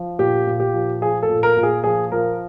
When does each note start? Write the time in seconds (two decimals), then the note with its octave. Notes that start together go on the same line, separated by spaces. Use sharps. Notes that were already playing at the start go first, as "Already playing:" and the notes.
Already playing: F3
0.19 A#2 G4
0.47 A#2
0.60 G4
0.74 F3
1.01 F3 G#4
1.23 A4
1.29 A#2
1.43 A#4
1.57 A#2
1.63 G#4
1.84 F3 G#4
2.12 F3 A#4